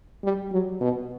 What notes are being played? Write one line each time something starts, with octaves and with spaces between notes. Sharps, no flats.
G3
F#3
B2